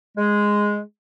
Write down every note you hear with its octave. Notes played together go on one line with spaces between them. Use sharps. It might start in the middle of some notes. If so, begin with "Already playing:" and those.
G#3